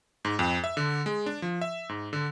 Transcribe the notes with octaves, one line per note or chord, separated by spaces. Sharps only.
G#2
F2
E5
D3
G#3
D4
F3
E5
G#2
D3